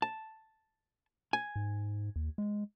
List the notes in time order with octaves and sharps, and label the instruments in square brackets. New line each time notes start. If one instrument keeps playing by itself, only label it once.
[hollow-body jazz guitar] A5
G#5
[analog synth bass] G#2
D#2
G#3